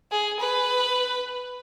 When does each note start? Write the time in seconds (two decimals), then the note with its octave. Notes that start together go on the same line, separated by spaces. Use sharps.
0.11 G#4
0.40 B4